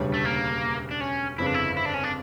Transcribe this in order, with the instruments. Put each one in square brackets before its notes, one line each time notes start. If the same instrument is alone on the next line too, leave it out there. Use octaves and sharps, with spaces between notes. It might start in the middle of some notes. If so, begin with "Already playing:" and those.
Already playing: [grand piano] E1 D2 C#3 G3 C#4
[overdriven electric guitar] A3
A#3
D4
C#4
[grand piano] G1 F2 C#3 [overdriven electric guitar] E4
[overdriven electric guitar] D4
E4
E4
D4
C#4
D4